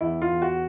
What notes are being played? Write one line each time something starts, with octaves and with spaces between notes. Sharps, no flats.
E2 E4
F4
E2
F#4